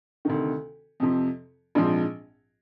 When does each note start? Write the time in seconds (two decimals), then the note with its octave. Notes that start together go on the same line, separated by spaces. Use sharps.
0.25 D2 C3 D#3
1.00 F2 C3 F3
1.75 A#1 G#2 F3 C4